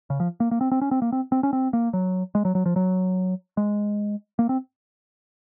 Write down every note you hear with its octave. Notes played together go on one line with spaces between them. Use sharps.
C#3
F3
A#3
A#3
C4
C4
C#4
C4
A#3
C4
C4
C#4
C4
A#3
F#3
G#3
F#3
F#3
F3
F#3
G#3
A#3
C4